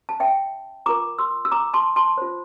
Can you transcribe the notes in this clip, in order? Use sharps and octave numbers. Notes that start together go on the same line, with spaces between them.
A5
E5 G5
F4 A#4 A#5 D6
C6 E6
E6
A#5 D6
A5 C6
A5 C6
F4 C5